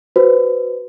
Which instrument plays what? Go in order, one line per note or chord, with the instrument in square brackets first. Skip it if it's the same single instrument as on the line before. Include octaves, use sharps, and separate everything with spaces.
[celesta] F#4 B4 C5